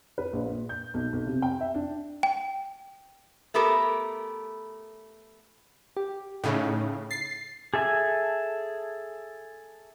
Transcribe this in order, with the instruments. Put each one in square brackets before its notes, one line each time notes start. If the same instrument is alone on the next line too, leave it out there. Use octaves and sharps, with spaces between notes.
[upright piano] B4
A#1
A#2
G6
B1
B1
C3
G5
E5
D4
[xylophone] G5
[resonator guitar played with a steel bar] A3 B3 G4 A4 A#4
[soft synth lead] G4
[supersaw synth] A2 C#3 [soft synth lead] D#4
[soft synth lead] A6 [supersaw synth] C7
[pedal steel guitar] G#4 A4 E5 G#5